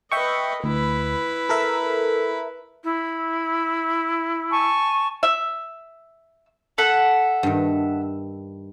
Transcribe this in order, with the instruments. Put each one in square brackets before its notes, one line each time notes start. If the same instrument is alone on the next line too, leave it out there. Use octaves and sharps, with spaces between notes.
[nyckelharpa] B4 D#5 [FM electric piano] E5 G5 C#6
[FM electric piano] D2 [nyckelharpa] E4 B4
[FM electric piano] A4 A#4 E5
[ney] E4
[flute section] G#5 A5 C#6
[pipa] E5
[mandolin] A4 E5 F#5
[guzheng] G2 D#3